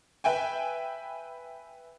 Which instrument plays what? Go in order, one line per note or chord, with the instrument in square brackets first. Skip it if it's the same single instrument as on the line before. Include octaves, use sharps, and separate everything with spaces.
[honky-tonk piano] B4 E5 G5 G#5